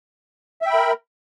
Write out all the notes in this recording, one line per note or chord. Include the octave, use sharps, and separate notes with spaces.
A#4 E5 G5 B5